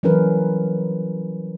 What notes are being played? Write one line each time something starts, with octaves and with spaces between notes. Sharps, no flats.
E3 F#3 G3 C#4 A#4 B4